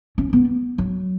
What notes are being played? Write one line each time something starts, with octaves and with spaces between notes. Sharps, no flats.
C#4
B3
F#3